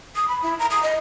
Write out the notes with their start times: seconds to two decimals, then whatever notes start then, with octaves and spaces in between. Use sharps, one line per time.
0.15 D#6
0.28 B5
0.42 E4
0.59 A#5
0.70 D#6
0.82 D#5